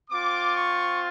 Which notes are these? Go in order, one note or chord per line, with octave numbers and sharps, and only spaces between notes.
C4 F4 D6
C#6